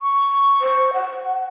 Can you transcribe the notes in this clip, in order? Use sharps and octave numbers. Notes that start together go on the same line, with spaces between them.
C#6
C5
F#5